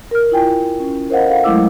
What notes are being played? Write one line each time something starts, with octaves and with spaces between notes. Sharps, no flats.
A#4 F6
E4 F4 G5 G#5
C#4
A#4 C5 D#5 F5 F#5
A4 F5 F#5
F#3 G#3 A3 E4 D6 E6